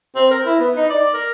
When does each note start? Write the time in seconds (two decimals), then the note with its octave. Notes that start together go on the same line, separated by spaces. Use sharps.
0.16 C4
0.31 A#4
0.46 E4
0.59 B3
0.76 D#4
0.90 D5
1.14 A#4